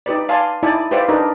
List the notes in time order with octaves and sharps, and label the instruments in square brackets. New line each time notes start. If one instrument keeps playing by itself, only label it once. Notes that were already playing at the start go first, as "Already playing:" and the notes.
[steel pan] D#4 G4 B4 D5
D5 F5 G#5 A5 C6
D#4 E4 D5 G#5 A5
G4 B4 C5 D5 E5 F5
D4 D#4 G4 A#4 B4 D5